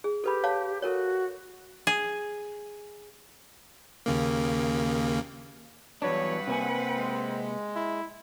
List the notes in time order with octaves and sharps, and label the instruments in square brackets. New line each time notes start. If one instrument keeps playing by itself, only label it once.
[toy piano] G#4
[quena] G4 [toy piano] A4 B4 B5
[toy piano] C#5 F5 A5
[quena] F#4 [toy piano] A4 A#4 C#5
[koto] G#4
[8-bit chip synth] D#2 C#3 A#3
[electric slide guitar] E2 F#3 D4 [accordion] G2 [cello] B4 F#5 [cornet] C#5
[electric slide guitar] C3 A#3 G#5 [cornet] C4
[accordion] G#3
[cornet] E4